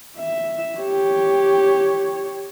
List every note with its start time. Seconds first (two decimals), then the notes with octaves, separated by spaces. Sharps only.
0.18 E5
0.79 G4 C#5